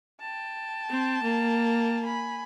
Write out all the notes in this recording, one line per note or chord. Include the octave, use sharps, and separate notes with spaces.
G5 A5
C4
A#3
G#5 B5